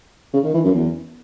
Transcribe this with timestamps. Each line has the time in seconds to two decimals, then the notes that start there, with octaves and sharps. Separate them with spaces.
0.33 C#3
0.44 D#3
0.54 E3
0.64 F#2
0.74 E2